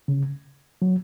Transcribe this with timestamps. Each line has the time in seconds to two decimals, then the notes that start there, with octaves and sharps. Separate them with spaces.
0.08 C#3
0.82 F#3